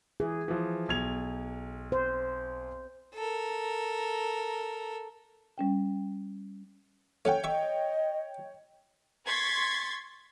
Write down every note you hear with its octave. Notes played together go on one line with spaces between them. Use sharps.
E3 G#4
E3 F3
B1 G#6 F7
C5
A4 A#4
G3 C#4 G5
A3 C#4 C#5 F#5 G5
D#5 E5 C#6
C6 C#6 G#6 A6 B6